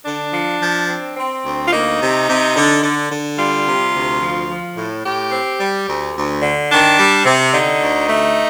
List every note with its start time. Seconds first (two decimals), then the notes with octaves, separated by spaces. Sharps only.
0.06 D3 D4
0.34 F3
0.62 F3
0.89 C4
1.17 C4
1.45 D2
1.67 F4
1.72 A#3 D#4
2.01 C3
2.28 C3
2.56 D3
2.83 D3
3.11 D3
3.39 G3 F4
3.66 C3
3.94 D2
4.21 F3
4.49 F3
4.77 A2
5.05 A2 G4
5.32 C4
5.60 G3
5.87 D2
6.16 D2
6.43 D3
6.70 D#3 D4
6.99 G3
7.26 C3
7.54 D3 D#4
7.82 D2
8.10 A3